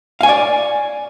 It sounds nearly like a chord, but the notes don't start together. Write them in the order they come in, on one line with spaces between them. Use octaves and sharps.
F5 G#5 C#5 D5